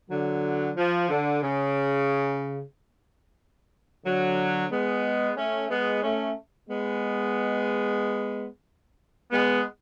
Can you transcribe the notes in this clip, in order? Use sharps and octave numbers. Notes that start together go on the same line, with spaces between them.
D3 F#3
F3
D3
C#3
D3 F#3
G#3 B3
A3 C#4
G#3 B3
A3 C#4
G#3 B3
G#3 B3